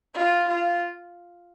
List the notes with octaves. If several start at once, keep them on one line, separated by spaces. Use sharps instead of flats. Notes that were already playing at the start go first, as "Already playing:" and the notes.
F4
F4